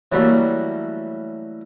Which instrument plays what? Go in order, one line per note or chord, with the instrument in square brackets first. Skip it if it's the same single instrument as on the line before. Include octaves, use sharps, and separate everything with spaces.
[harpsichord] E3 F#3 G3 A3 A#3